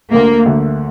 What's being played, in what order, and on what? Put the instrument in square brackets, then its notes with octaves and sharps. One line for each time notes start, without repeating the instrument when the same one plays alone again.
[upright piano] D2 D3 A3 [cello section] A#3
[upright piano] D2 D3 A3